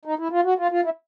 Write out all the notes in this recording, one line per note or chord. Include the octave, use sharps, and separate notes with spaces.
D#4
E4
F4
F#4
F4
F4
E4